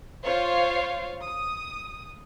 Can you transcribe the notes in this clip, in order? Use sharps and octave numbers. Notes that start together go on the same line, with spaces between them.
F4 C5 C#5 F5
D#6